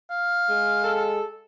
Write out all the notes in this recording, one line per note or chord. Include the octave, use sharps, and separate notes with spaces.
F5
G#3
A4